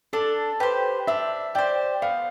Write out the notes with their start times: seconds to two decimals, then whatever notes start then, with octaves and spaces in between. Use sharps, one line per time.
0.13 D4 A4
0.60 G4 B4 C5
1.07 D4 E5
1.55 G4 C5 D5
2.02 B3 F5